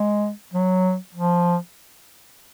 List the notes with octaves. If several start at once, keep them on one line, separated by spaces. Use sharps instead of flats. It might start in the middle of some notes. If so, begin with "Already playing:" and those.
Already playing: G#3
F#3
F3